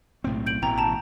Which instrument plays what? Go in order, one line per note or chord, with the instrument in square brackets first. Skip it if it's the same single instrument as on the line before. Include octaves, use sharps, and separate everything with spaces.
[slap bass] B1 A2 C4
[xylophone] G6 D7 F#7
[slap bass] A1 B2 E3 [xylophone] G5 A#5
[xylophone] A5 A#5